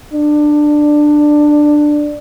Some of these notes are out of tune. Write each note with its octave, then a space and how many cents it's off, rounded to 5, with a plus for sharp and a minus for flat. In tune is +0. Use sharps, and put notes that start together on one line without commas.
D4 +15